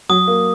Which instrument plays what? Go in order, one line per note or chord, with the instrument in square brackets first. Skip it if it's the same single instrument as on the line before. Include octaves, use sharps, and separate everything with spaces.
[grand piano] F#3 [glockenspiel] D#6
[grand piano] A#3